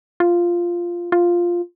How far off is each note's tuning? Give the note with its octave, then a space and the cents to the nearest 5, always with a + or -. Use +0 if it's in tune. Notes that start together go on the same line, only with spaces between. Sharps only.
F4 -5
F4 +0